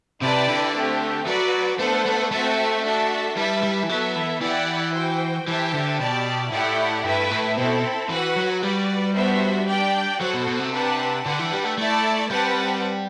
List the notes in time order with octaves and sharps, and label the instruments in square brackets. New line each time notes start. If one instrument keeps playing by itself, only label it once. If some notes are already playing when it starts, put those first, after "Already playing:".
[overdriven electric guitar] C3 [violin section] E4 G4 B4 D5 A5
[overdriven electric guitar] D3
[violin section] A3 C4 G4
[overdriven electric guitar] F#3 [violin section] F#4 B4 D5
[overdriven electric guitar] A3 [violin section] B3 D4 A4 C5 F#5
[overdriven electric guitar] A3
[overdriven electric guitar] A3 [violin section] C4 F#4 A4 E5 A5
[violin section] D4 F#4 A4 E5 A5
[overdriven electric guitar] G3 [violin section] E4 B4 E5 A5
[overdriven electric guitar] G3
E3
[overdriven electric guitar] F#3 [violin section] B3 E4 A4 E5
[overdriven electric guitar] E3
[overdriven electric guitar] E3 [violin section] E4 G4 D5 F#5
[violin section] F#4 C5 G5
[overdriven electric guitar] E3 [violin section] G4 C5 E5 A5
[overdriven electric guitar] D3
[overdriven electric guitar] B2 [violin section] G4 D5 A5
[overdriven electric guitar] A2 [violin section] A3 E4 G4 D5 F#5
[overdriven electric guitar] G2 [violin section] A3 E4 B4 E5
[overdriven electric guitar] A2
[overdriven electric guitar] B2 [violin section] C4 E4 A4
[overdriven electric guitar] E3 [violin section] F#4 B4 F#5
[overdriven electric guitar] F#3
[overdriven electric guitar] G3 [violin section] F#4 B4 D5
[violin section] B3 D4 F#4 C5 E5
D4 G4 D5 G5
[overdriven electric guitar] F#3 [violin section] F#4 A4 C5 F#5
[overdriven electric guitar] B2
B2
C3
[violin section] D4 G4 B4 F#5 A5
[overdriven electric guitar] D3 [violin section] D4 G4 B4 F#5
[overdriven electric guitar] E3
G3
A3
[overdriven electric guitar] A3 [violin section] E4 A4 D5 A5
[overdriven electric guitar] G3 [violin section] C4 G4 B4 F#5 A5